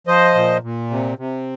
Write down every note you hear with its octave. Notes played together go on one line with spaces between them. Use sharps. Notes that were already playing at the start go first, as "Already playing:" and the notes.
F3 C5 D#5
A#2
A#2
C3
C3